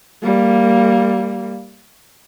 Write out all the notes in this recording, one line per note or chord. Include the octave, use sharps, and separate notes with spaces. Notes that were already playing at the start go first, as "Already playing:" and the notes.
G3 A#3